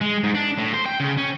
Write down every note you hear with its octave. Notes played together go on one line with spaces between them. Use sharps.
G#3
G#2
D4
A2
C5
G5
C#3
C#4